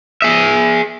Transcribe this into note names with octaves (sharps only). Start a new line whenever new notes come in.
G#4 E5